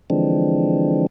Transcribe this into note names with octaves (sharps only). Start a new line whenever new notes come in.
D3 E3 F3 G#3 C4 D4